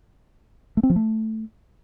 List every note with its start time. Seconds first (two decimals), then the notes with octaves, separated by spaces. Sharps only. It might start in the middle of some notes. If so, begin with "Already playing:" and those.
0.77 A3
0.83 C4
0.90 F3
0.96 A3